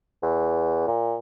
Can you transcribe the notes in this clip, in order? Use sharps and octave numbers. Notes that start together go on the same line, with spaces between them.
E2
A#2